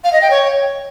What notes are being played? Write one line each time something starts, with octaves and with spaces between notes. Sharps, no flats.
F5
D#5
G5
C#5